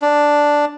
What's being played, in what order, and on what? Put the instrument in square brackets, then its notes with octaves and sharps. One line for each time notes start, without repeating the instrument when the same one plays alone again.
[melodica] D4